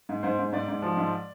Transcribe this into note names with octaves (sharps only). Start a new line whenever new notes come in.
G#2
G#2 C5
G#2
G#2 D5
G#2
F3
G#2